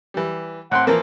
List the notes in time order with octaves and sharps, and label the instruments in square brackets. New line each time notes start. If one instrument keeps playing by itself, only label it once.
[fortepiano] E3 G3
[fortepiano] A2 C4 C6 [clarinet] F#5
[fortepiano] E3 F3 A#3 [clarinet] A#4